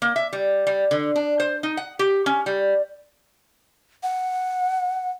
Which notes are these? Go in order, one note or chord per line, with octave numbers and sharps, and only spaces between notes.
A#3
E5
G3
G3
D3
D4
C5
D#4
F#5
G4
C#4
G3
F#5